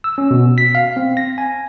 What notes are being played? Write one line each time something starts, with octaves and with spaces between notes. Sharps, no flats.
E6
C#4
B2
B6
F5
C4
A#6
G#5